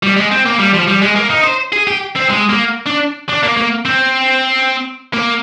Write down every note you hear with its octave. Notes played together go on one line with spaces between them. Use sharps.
G3
G#3
C4
A#3
G3
F3
G3
G#3
A#3
D#4
C5
G#4
G4
C4
G#3
A#3
D4
D4
A#3
A#3
C4
A#3